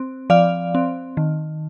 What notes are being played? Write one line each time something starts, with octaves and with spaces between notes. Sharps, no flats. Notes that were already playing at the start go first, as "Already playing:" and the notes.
Already playing: C4
F3 D5 F5
C4
D#3